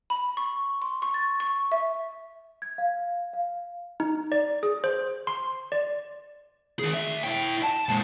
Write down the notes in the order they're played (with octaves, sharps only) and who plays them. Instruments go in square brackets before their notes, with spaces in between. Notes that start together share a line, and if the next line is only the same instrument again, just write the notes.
[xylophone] B5
C#6
C6
C#6
A6
C#6
E5
[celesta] G#6
F5
F5
[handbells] D#4
D5
G#4
C5
C6
D5
[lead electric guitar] D#3 G#4
D2 E5
E4 G5
A5
A#2 G#3